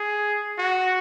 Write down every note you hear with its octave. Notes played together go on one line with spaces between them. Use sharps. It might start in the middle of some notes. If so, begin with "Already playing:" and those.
Already playing: G#4
F#4